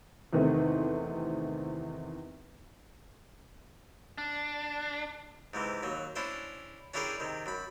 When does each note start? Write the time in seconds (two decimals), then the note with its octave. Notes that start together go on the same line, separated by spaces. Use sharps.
0.33 E2 C3 D#3 A3 C4
4.18 D4
5.54 G#2 C3 E3
5.83 D#2 F#3
6.16 C#4 D4 E4 C5
6.94 C#4 D4 E4 G4 G#4 A#4
7.20 C3 D#3
7.46 F#2 B5